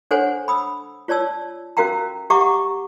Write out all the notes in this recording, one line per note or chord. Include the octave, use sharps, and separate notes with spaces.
D4 A4 C5 C#5 F#5 G#5
B5 D#6 E6
F4 C#5 D5 A5 E6
C#4 F#4 A#4 F5 G5 A#5
G4 E5 F#5 A#5 C#6 D6